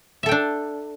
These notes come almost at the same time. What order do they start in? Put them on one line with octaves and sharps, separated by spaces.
E5 A4 G5 D4